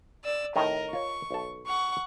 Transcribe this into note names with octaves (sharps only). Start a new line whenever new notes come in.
D5 E6
A2 C3 D#3 A#4 D#5
F4 C#5 C#6
B1 A4
F#5 C#6